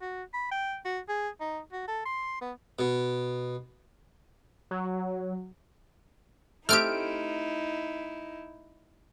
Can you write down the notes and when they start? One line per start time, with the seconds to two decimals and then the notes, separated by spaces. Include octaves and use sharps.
0.01 F#4
0.34 B5
0.51 G5
0.85 F#4
1.09 G#4
1.40 D#4
1.73 F#4
1.88 A4
2.06 C6
2.41 B3
2.79 B2
4.71 F#3
6.69 A3 C4 D#4 E4 G4 F6 D7